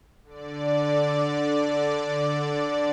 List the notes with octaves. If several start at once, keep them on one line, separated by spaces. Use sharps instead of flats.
D3 D5